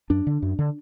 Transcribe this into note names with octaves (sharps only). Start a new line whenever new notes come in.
F#2 D4
D3
F#2
D3